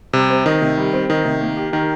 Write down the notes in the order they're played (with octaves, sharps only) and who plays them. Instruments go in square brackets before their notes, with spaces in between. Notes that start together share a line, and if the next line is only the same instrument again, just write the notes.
[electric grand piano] C3 [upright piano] G3
[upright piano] C4
[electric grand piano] D#3 [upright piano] D#4
[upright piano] C3
G3
C4
[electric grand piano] D#3 [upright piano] D#4
[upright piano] C3
A#3
G4
[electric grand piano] D#3 [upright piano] A#4